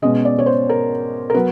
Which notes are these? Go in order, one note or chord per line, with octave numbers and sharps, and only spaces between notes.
B2 G#3 C#4 D#5
D5
C#5
C5
A#4
A#4
F#3 B3 B4